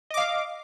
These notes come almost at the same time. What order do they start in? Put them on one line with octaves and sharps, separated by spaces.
D#5 D6 F5